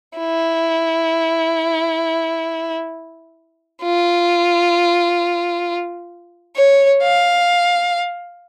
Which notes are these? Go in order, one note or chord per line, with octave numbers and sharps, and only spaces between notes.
E4
F4
C#5
F5